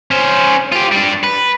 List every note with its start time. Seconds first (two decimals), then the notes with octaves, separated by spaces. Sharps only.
0.11 C#4 C5
0.73 F4 G4
0.92 G3 D4
1.24 B4